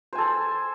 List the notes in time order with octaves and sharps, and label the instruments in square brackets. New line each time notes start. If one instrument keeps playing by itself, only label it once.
[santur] C5
G#5
A4